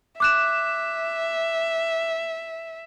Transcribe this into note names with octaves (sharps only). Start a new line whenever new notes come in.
E5 D6 F#6 E7